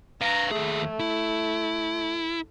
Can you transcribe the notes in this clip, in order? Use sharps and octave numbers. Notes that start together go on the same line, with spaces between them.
B4 F5 A#5
D#2 A3 G#4
E4